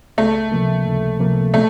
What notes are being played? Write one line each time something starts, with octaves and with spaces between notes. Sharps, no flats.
C#2 A3
C3 F3 A#3
C#2
C3 F3 A#3
B2 A3